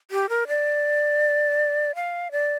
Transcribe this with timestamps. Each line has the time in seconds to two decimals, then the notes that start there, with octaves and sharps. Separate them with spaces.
0.11 G4
0.29 A#4
0.48 D5
1.95 F5
2.31 D5